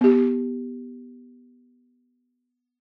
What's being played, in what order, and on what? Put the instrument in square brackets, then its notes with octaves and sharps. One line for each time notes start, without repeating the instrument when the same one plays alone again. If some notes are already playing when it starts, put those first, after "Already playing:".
[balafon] B3 G4